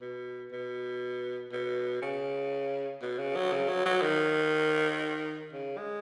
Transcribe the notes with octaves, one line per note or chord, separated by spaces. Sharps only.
B2
B2
B2
C#3
B2
C#3
F#3
C#3
F#3
F#3
D#3
C#3
G#3